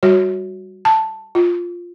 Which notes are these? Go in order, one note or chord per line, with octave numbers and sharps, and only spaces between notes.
G3 F#4 C#5
A5
F4